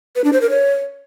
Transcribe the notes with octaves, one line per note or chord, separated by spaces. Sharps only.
B4
D4
C5
A#4
C#5